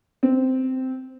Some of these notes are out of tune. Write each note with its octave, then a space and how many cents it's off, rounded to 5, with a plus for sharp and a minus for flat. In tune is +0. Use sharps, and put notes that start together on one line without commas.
C4 -10